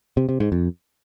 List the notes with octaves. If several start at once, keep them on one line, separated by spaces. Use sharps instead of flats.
C3
C3
G#2
F2